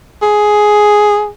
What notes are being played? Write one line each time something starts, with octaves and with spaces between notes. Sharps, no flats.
G#4